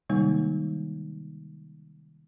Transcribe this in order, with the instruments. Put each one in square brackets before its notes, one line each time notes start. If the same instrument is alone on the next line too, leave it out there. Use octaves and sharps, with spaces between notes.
[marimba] C3 D#3 G3 G#3 A#3 D#4